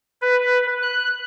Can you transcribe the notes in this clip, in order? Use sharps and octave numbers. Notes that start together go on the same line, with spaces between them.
B4
F#6